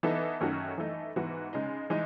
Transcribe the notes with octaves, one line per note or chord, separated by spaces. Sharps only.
E3 B3 D#4 A4 E5
F#2 D#3 A3 C#4 F#4
E3 A3 D#4
G#2 E3 B3 F#4
C#3 G#3 D#4
E3 G#3 D#4